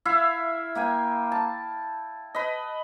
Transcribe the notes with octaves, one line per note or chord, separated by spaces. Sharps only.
E4 E5 F5
A#3 G5 G#5
A5
B4 D#5